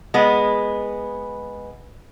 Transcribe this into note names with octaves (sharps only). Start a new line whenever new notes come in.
G#3 B3